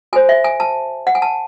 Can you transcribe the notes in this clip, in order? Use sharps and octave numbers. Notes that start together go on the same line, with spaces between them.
F#4 A4 C5 G#5
E5
G#5
A5
F#5
G#5
A5